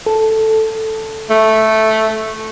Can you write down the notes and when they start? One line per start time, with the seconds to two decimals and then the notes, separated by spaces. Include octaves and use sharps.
0.06 A4
1.30 A3